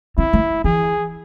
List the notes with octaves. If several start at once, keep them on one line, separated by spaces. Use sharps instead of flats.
C4 E4
A3
E3 G#4